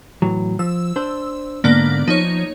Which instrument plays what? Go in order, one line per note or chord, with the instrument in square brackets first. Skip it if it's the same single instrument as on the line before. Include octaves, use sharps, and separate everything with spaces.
[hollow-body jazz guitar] A2 E3 F#3
[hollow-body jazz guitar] F3 [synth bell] E6
[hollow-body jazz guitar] D4 C5
[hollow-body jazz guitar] G#2 D3 [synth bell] A#3 B3 D5
[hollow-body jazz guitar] F3 [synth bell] D#4 C#5